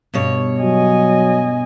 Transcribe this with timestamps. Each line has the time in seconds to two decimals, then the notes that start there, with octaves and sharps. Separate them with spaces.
0.14 G2 B2 C#5
0.62 F#3 D#5 G#5